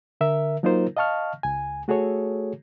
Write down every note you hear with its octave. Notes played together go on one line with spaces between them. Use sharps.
D3 A#4 E5
F#3 A#3 D#4 F4 A#4 C5
D#5 F5 A5 C#6 F6
C#2 G#5
A3 F#4 G#4 A4 C#5